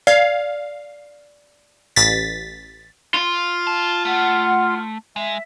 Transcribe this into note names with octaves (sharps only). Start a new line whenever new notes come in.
D5 F5
A1 A6 B6
F4
A5
A3 F#5 F6
G#3 E5